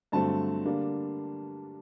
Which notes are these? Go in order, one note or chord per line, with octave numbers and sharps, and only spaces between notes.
G2 D3 F#3 A3 C4 A5
D3 G3 A#3 D4